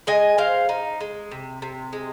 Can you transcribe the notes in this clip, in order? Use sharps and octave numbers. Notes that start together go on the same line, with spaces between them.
G#3 D#5 G#5
G#3 C5 F5
D#4
G#3
C3
C3
G#3